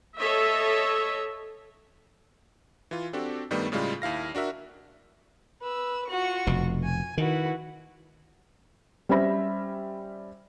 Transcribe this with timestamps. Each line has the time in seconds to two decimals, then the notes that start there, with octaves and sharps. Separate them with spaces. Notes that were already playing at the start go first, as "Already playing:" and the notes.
0.18 A4 C#5 D#5 E5
2.91 E3 F4
3.13 C4 D4 F#4 G4 A4
3.51 G2 D#3 G3 A3 B3
3.72 A2 C#3 G3 G#3 F4
4.02 D#2 E4 F5 A#6
4.35 D4 F#4 A#4 E5
5.62 B4 E6
6.08 F4 F#4 C#6
6.47 F1 B2
6.84 G#5
7.18 D#3 E4 F#4 B4
9.09 G3 C#4 C5 E5 B5 A#6